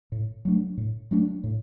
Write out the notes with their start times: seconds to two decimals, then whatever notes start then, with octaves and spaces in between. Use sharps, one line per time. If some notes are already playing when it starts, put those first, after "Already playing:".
0.12 A2
0.45 F#3 A3 D4
0.78 A2
1.11 F#3 A3 D4
1.44 A2